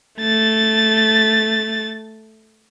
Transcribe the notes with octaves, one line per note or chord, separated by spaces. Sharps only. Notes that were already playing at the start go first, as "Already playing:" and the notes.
A3 A6